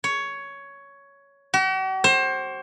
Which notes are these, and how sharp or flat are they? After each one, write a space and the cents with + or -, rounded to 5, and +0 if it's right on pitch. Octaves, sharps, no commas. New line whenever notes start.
C#5 +10
F#4 +45
C5 +25